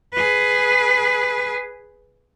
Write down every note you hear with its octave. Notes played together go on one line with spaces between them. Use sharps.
G#4 B4